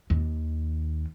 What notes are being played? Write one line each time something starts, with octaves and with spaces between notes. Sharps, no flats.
D#2